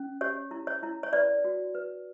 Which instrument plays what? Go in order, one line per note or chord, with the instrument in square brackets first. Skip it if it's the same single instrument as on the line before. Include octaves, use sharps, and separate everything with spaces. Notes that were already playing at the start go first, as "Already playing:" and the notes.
Already playing: [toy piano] C#4
G4 C#5
E4
C#5
E4
C#5
B4 D5
F#4
B4